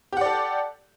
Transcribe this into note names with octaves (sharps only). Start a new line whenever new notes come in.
G4 A4 D5 F#5